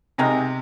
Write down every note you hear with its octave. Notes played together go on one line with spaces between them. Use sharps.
C3 D#3 G#3 D#4 A#4